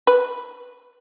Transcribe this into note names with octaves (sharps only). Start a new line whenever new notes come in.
B4